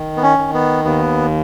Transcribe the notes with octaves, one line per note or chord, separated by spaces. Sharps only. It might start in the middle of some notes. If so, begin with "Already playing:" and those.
Already playing: D#3
B3
C#4
D#3
B3
D#2 B3